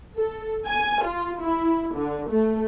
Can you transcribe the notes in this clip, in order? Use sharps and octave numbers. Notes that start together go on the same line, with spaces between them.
A4
G#5
F4
E4
D3
A3